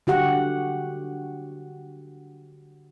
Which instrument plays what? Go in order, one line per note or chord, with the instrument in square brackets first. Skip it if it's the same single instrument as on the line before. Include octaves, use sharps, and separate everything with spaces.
[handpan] D3 F#4 G4 F#5